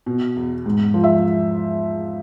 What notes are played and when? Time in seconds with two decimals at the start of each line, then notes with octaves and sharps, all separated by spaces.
0.06 B2
0.36 E2
0.66 G#2
0.94 F3
1.04 E5